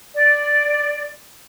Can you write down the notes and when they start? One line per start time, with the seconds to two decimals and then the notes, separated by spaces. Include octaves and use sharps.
0.15 D5